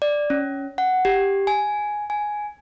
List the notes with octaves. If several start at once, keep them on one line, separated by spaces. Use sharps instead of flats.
D5
C#4
F#5
G4
G#5
G#5